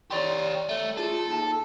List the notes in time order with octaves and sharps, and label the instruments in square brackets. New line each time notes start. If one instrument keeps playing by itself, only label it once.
[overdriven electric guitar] G4 C#5 [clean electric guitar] D5 C6
[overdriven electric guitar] A3
[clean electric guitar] F4 G#4 [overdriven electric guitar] A4
[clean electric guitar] D#2 A5